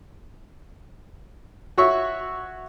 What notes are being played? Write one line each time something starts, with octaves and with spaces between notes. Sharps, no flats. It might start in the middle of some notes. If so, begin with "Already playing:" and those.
F#4 C#5 E5 C#6